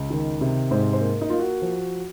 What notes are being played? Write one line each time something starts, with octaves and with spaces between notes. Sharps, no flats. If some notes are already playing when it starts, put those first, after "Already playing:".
Already playing: C#2
D#3
C3
G#2 C5
C5
A#3
D#4
A#3 F4
F#4
F3